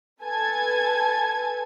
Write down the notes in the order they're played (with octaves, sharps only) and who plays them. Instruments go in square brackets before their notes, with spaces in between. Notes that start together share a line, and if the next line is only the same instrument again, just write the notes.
[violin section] A4 B4 G#5 A5 G#6